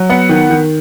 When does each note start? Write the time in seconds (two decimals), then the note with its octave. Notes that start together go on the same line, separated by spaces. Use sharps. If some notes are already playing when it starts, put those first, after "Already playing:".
Already playing: F#3
0.10 B3 F#5
0.29 D#3
0.50 D#3